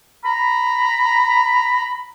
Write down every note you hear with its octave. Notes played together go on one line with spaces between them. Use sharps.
A#5 B5